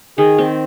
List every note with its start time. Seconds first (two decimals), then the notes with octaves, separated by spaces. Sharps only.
0.18 D#3 G#4
0.38 C4